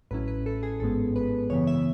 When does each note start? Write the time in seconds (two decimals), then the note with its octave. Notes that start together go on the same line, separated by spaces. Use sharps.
0.11 A1 A2 F#3 C#4 E4 B4
0.28 B4
0.46 A4
0.63 G#4
0.80 G#1 G#2 G#3 B3 A4
1.16 B4
1.50 F#2 C#3 E3 B3 C#5
1.67 E5